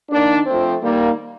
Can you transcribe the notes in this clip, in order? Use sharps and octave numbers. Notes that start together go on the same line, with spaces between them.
D#3 A#3 D4
F3 A3 C4
D#3 G3 A#3